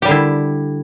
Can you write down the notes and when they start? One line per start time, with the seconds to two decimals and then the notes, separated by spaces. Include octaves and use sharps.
0.02 G4
0.05 G3
0.08 D3
0.11 E4